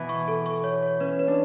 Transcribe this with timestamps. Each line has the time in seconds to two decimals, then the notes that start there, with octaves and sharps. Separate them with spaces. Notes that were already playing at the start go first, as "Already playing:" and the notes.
Already playing: B2 E3
0.09 C#6
0.28 A4
0.46 C#6
0.64 C#5
0.83 C#5
1.00 C#4 B4
1.19 B4
1.28 D4